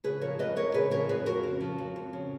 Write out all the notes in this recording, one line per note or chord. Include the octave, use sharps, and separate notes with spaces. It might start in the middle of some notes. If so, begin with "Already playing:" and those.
C#3 G#4 B4
F3 A#4 C#5
F2 B4 D#5
F2 A#4 C#5
C#3 G#4 B4
F3 A#4 C#5
F2 G#4 B4
F2 F#4 A#4
C#3
F3
F2
F2
C#3